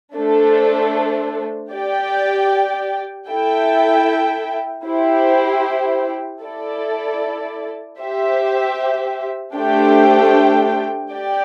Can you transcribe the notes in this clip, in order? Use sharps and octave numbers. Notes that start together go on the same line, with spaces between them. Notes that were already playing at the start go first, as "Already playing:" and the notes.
A3 D4 A4 C5
G4 D5 G5
E4 A4 E5 G5
E4 G4 C5 G5
E4 A4 D5
G4 C5 E5
A3 D4 G4 C5 G5
G4 D5 G5